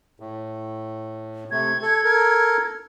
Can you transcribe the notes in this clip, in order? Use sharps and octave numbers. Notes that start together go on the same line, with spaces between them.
A2
C3 A3 G#6
A4
A4 A#4